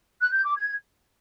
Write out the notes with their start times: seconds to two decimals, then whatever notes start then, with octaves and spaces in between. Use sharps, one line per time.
0.21 F#6
0.33 G6
0.45 D6
0.57 G#6